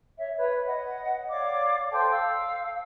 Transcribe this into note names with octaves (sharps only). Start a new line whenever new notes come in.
C#5 E5
B4 C#5
D#5 F#5
C#5 D5 F5 D6
A4 C5 G5 A5
F5 E6